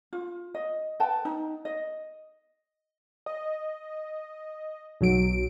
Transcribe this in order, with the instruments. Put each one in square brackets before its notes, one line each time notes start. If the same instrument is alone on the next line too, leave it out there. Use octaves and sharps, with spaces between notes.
[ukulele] F4
D#5
B4 F#5 G5 A5
D#4
D#5
[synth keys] D#5
B1 F#3 D7